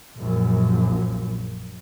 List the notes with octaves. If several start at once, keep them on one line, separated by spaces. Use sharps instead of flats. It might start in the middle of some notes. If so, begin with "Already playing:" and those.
A#1 F#2